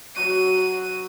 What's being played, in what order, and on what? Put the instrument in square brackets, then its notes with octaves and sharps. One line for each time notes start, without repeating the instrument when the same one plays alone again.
[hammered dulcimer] F#3 F#4 [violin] D#7